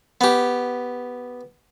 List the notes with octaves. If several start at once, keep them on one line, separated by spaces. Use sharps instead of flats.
B3 G4